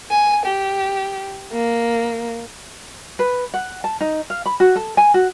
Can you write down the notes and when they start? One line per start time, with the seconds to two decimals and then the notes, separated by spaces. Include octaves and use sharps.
0.11 G#5
0.46 G4
1.52 A#3
3.19 B4
3.54 F#5
3.84 A5
4.01 D#4
4.30 F5
4.46 B5
4.60 F#4
4.76 A4
4.97 G#5
5.14 F#4